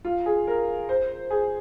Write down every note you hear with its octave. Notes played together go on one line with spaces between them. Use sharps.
F4
G#4
A#4
C5
G#4